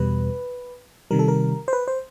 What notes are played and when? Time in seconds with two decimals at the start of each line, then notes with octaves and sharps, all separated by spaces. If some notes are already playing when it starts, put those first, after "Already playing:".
Already playing: E2 B2 G3 B4
1.11 C3 D#3 G3 A#4
1.19 A4
1.28 A#4
1.68 C5
1.73 B4
1.88 C5